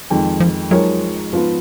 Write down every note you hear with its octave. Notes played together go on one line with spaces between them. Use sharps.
F2 D#3 G#3
F3
F3 F#3 G#3 D#4 A#4 C#5
G#2 F3 B3 F4 B4